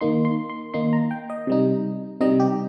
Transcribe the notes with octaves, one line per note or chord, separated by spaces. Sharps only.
D#3 A#3 D#4 C6
C6
C6
D#3 A#3 D#4 C6
A#5
G5
D#5
C3 G3 D#4
C3 G3 D#4 D#5
G4